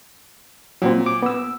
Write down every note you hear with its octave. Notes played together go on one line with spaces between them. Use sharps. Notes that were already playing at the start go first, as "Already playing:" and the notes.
A#2 F#3 C4
D6
B3 E6